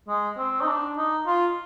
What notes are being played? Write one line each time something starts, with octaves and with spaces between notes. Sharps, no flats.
G#3
C4
D#4
D4
D#4
F4